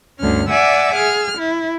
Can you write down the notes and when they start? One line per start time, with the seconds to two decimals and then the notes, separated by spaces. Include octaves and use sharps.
0.18 D2 G2 C#4 F6
0.49 D5 E5 F#5 G#5 D6 E6
0.95 G#4 F6
1.38 E4